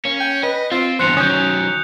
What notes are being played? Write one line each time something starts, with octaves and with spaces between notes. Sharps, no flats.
A#3 C#4
G5
B4 D#5
C4 F4
E2 G2 C5 F#6 C#7 F7
D#3 F#3 C#4 D#6 G6